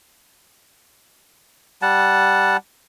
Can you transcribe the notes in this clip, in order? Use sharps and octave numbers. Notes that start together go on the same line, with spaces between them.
G3 F#5 A5